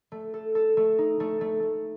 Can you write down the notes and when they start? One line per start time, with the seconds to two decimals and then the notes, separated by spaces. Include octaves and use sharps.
0.12 A3
0.34 A4
0.55 A4
0.77 A3
0.98 D#4
1.20 A3
1.41 A3
1.63 A3